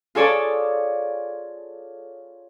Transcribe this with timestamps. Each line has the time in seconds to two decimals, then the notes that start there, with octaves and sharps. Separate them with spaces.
0.15 F4 G#4 A4 C#5 D5 A5